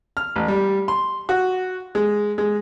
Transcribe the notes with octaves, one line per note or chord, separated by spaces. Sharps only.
F6
A1
G3
C6
F#4
G#3
G#3